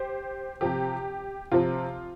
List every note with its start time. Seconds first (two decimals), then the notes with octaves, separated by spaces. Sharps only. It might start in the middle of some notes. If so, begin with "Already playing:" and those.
Already playing: G4 C5
0.61 C3 F3 G4
1.52 C3 F3 F4